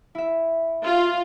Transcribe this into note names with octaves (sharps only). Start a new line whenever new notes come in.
E4 E5
F4